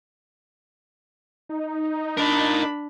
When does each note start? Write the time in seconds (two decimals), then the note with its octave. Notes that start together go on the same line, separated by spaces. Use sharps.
1.49 D#4
2.17 D4 A#4 D5 B5